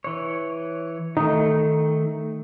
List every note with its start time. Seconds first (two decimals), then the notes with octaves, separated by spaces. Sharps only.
0.04 E3 C#5
1.17 D#3 A3 D#4